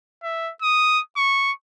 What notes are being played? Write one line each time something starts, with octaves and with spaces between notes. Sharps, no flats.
E5
D#6
C#6